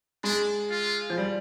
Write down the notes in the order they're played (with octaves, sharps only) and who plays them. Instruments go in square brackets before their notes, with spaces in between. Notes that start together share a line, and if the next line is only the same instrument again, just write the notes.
[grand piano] G#3 [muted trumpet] D4
[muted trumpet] F4
[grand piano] F3
G3